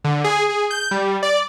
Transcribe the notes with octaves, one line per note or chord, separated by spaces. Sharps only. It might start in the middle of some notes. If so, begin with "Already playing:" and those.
D3
G#4
G#4
G6
G3
D5